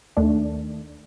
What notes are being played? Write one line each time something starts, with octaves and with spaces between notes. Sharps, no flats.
D#2 D#3 A3 D4